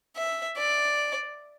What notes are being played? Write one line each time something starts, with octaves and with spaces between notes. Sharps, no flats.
E5
D5